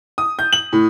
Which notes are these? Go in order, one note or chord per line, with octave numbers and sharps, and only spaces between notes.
D#6
G6
F#7
A2